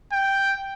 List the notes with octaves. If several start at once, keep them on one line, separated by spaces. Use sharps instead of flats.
G5